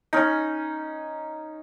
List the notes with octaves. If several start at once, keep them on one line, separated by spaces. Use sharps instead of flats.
C#4 D#4